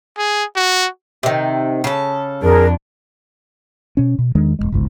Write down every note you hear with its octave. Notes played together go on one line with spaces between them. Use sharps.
G#4
F#4
C3 D#3
C#3 A4
F2 D4 G#4 A#4
B2 C#4
B2
E2 D#3 G#3 D4
E1 C2 G#3
G1 C#2 G#2